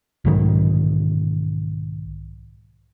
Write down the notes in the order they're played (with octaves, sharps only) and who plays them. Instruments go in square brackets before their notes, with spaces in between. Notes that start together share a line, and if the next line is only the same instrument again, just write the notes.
[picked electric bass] B1 G#2 D#3